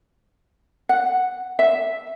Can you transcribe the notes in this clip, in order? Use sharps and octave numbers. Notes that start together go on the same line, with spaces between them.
F#5
E5